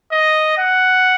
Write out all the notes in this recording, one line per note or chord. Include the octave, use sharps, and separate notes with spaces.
D#5
F#5